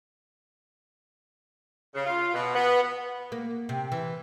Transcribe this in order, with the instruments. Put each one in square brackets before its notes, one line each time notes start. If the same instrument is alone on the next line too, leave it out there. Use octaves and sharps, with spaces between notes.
[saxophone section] C#3
F4
B2
B3
[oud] A#3
C3
E3